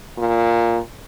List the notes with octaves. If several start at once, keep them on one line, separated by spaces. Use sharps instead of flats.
A#2